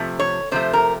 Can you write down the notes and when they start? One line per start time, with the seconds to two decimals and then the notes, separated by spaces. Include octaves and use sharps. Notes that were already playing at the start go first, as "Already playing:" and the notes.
Already playing: C3 F3 A3
0.19 C#5
0.51 C3 F3 A3 C5
0.73 A#4